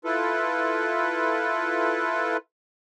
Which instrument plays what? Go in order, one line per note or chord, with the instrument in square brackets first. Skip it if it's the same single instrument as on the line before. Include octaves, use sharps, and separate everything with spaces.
[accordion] E4 F4 A4 B4